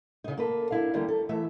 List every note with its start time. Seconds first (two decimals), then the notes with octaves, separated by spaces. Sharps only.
0.24 C#3 D#4
0.37 A#3 A4 B4
0.71 D4 E4 F5
0.94 D#2 D3 E3 G3 A#3
1.08 A4
1.29 E3 A3 E5